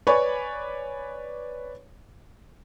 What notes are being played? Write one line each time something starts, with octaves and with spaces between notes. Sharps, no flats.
B4 C#5 D5 G#5 B5 C#6